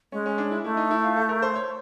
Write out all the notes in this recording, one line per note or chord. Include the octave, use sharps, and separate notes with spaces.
G#3 C#4
C#4
D4
E4
A3 E4
D#4
E4
F4
A4
A#4
C5
C#5